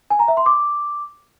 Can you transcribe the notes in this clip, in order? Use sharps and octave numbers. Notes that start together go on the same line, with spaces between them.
G#5
A#5
E5
C6
D6